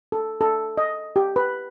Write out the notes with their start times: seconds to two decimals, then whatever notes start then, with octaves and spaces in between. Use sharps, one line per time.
0.12 A4
0.41 A4
0.77 D#5
1.16 G4
1.36 B4